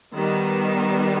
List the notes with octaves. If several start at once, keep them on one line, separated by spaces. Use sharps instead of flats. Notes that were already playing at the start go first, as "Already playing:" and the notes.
D#3 G3 B3